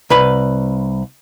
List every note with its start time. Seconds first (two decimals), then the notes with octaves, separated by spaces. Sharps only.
0.10 C2 B4 B5